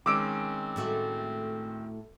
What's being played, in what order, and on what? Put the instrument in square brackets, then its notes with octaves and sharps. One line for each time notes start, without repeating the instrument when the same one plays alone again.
[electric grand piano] D#3 G#3 C#4 [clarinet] C4 [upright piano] D6 E6 D7
[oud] A2 A3 F#4